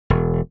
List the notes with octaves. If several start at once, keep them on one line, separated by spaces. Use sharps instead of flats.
E1